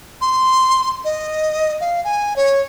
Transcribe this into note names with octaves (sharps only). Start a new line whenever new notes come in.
C6
D#5
F5
G#5
C#5